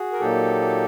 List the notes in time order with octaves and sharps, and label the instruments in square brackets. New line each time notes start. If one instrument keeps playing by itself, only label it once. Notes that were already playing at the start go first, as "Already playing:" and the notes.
Already playing: [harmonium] F#4 G#4
A#4
A#2 F#3 A#3 D#4 G4 A4